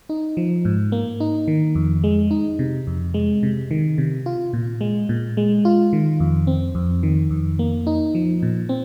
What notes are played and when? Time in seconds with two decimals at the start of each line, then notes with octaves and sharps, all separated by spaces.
0.09 D#4
0.37 F3
0.65 G#2
0.92 A#3
1.20 D#4
1.48 D#3
1.75 F2
2.04 G#3
2.31 D#4
2.59 C3
2.87 F2
3.14 G#3
3.43 C3
3.71 D#3
3.98 C3
4.26 F4
4.53 A#2
4.81 G#3
5.09 A#2
5.37 G#3
5.65 F4
5.93 D#3
6.20 F2
6.47 C4
6.75 F2
7.03 D#3
7.30 F2
7.59 A#3
7.87 D#4
8.15 F3
8.43 A#2
8.69 C4